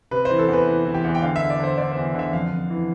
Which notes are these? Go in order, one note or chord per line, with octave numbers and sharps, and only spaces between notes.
C3 B4
C5
E3
A4
E2 B4
E3
E3
G4
E2
G5
D3 F5
E5
D3
D5
D3 C5
D3 D5
C5
E2
D3 E5
F2 F5
F2
E3